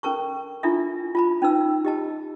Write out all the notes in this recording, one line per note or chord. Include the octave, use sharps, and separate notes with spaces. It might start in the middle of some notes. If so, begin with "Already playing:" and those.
C#4 A4 A#4 A5 C#6
D4 E4 F4 A4 E5
F4 A5 B5
C#4 D#4 B4 E6
G4 D#5 A5